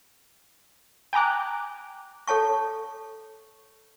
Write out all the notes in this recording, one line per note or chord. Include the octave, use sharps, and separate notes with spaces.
G5 G#5 A#5 D6 F#6
A4 C#5 A5 C#6